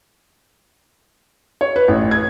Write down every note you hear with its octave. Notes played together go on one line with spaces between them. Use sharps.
C#5
B4
A1
G#6